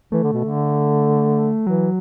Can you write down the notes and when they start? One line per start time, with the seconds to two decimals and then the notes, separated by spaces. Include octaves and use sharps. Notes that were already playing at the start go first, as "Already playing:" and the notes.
0.12 E3 A3
0.23 D3
0.33 B2
0.44 D3
1.66 E3 F#3